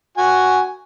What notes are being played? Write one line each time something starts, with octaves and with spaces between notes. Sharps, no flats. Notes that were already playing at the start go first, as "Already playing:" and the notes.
F#4 G#5